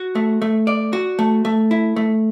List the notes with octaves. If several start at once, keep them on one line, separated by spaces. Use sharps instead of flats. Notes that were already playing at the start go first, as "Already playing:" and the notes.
Already playing: F#4
A3
A3
D5
F#4
A3
A3
E4
A3